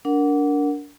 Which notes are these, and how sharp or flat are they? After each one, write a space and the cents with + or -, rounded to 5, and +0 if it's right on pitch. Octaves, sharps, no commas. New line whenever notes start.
D4 -25 A#4 +0 F#5 +0